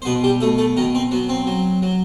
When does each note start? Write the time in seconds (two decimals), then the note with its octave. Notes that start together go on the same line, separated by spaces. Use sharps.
0.02 C5
0.05 B2 B3 B4
0.24 G3 G4
0.40 B2 A3 A4
0.58 A3 A4
0.77 B2 D#3 D#4
0.95 C4
1.11 F#3 B3
1.29 C4
1.47 F#3
1.82 F#3